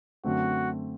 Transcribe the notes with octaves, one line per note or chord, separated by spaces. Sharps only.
F#2 D3 A3 C4 F#4